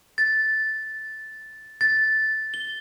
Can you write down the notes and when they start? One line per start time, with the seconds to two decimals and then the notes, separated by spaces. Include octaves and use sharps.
0.18 A6
1.81 A6
2.54 G7